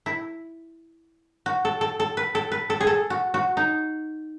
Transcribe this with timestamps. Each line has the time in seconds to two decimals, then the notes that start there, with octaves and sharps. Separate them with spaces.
0.06 E4
1.46 F#4
1.65 A4
1.81 A4
2.00 A4
2.17 B4
2.35 A4
2.52 B4
2.70 A4
2.81 G#4
2.87 A4
3.10 F#4
3.34 F#4
3.57 D#4